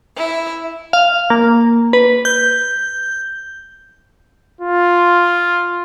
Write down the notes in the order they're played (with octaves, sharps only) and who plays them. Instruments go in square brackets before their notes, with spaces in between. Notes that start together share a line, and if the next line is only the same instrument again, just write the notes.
[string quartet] E4
[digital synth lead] F5
A#3
B4
G6
[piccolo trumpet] F4